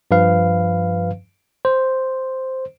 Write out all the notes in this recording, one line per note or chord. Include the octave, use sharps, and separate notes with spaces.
G2 F3 B4 F5
C5